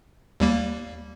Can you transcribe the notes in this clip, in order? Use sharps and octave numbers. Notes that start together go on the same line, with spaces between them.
D#2 G3 A#3